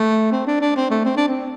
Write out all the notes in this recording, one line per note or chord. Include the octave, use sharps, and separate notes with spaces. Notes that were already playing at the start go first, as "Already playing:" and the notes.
Already playing: A3
C4
D4
D4
C4
A3
C4
D4
C4